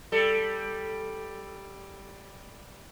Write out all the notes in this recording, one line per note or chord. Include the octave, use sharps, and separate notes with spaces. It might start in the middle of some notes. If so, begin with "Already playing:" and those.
G3 A4